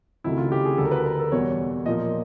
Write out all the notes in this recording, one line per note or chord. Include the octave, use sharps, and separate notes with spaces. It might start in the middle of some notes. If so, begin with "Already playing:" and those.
C#2 C3 D#3 F#3 A3 E4
F4
G4
G#4
D2 D3 F#3 A4
A#4
B4
A#4
A4
E2 B2 G3 C#5
A#2 F3 A#3 D#5